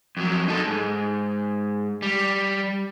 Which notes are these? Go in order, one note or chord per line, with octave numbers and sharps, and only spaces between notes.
F2 F#3
D#4 A4
G#2
G3